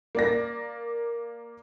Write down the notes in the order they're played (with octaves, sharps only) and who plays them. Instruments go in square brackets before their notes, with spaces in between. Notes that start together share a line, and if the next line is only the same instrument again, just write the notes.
[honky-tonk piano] A#3 D5 A#6